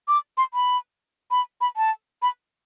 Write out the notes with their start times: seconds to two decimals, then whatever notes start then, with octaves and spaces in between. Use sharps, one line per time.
0.08 D6
0.38 C6
0.54 B5
1.31 B5
1.61 B5
1.77 A5
2.22 B5